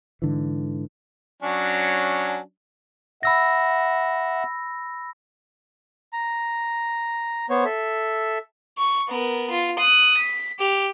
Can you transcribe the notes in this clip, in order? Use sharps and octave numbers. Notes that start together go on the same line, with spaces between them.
G#2 D3 E3
F#3 C#4 D4
E5 F#5 B5 E6 A#6
A#5
B3 C5 C#5
A4 E5
C#6
B3 A#4
F4
D#6 F#6
B6
G4 F7